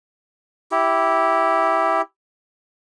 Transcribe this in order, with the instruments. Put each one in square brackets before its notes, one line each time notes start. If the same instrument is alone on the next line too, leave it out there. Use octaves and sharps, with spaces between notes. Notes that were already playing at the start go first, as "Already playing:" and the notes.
[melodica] E4 G4